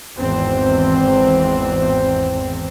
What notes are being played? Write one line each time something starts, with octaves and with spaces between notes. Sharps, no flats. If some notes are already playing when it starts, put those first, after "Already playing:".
G#1 E2 C4